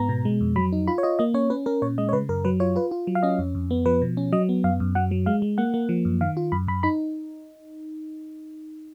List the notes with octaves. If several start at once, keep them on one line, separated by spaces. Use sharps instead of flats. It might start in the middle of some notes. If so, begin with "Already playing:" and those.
Already playing: G#2 B3 A#5
B2
G#3
F2
F#3 B5
D#4
F4 B5
C#5
F4 D#5
A#3 D#5
C#4 C#5
C#4 B4
C#4 A#4
A#2 C#5
G#3 D#5
C#5
C#3 B4
F#2 A#4
F#3 B4
F4 C#5
F4 B4
F4
F#3
F5
C#4 D#5
F2
F2
B3
F3 B4
B2
C#4
F#3 D#5
B3
F#2 F5
F#2
F#3 F#5
F#3
G#3 F5
G#3
A#3 F#5
A#3
F3
F#2
D#3 F5
F4
F#2 B5
F#2 B5
D#4 B5